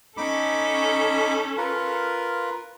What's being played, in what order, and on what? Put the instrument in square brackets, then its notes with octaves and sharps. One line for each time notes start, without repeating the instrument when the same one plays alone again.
[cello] C#4 A4 [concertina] D#4 B5 D6
[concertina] F4 A#4 B4